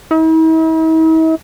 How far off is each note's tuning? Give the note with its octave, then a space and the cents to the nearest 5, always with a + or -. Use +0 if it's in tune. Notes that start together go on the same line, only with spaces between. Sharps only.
E4 -45